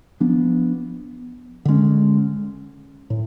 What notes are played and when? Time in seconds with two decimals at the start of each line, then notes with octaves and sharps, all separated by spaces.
0.20 F3 B3 D4
1.65 D3 G#3 C#4
3.10 A2